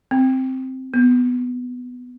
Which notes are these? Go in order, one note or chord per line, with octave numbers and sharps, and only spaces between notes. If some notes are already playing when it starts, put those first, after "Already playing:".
C4
B3